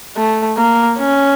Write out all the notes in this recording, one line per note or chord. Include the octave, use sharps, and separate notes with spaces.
A3
A#3
C#4